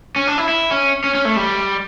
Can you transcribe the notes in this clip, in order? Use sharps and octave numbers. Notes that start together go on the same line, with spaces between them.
C#4
D4
E4
E4
C#4
C#4
C#4
A3
G3